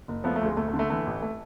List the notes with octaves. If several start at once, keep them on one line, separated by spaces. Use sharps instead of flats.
F#1
F3 A3 B3
A3
D2 G#3
D2 A3
A3
D3
A3
E3 A3
A1
A3